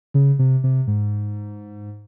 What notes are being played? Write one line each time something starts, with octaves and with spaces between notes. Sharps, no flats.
C#3
C3
C3
G#2